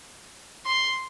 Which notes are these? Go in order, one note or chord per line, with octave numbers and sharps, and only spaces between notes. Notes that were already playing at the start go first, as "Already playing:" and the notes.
C6